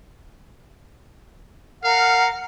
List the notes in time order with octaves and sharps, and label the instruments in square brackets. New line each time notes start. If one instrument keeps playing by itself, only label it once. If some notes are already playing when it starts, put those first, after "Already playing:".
[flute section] A#4 F#5 F6 [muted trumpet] F5